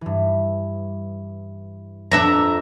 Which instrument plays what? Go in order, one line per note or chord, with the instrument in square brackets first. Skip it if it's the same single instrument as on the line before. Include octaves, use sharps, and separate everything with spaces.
[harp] G2 E3
[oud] F2 B3 D4 [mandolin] E5 A#5